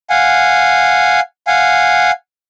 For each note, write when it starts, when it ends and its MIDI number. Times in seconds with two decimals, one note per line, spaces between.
0.10 1.20 77
0.10 1.20 78
0.10 1.20 80
1.47 2.11 77
1.47 2.11 78
1.47 2.11 80